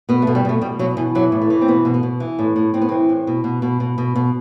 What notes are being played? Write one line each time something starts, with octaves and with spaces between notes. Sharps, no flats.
B2 B3
B2 A3
G3
B2 A3
B2 G3
B2 F#3
B2 E3
E3 F#3
A2
A3
E3
C4
B2 B3
B2
B3
B2
E3
A2
A2
A2 C4
B3
E3 C4
A2
B2
B2
B2
B2
B2
B2